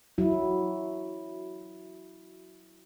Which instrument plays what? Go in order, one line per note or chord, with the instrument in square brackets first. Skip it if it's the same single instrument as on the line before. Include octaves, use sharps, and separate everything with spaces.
[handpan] F#3 E4